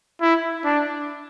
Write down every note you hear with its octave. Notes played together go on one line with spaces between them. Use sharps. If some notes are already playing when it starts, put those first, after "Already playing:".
E4
D4